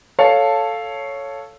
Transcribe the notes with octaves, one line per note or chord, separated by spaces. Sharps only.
A4 C#5 F5 A5